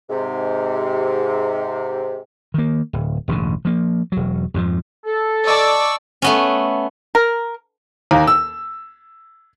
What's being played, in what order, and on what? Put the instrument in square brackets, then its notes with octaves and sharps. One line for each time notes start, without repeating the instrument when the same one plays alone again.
[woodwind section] G#2 C3
[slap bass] D#3 A#3
D1
E1 A1 G2 D3
F3 A#3
E1 F#3
F2 G#2 C3 F3
[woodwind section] A4
[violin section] D5 [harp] D#5 A5 D6 [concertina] C#6 E6
[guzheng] A3 B3 C#4
[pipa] A#4
[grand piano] D#2 A#3
E6